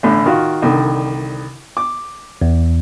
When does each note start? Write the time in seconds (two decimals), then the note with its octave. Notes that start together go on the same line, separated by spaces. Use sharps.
0.03 A1 A2 D3
0.26 D#3 F4 F#4
0.62 C2 D3 D#3
1.77 D6
2.42 E2